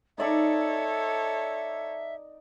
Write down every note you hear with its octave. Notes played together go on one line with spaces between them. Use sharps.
D#4 A4 C#5 D5 E5 A#5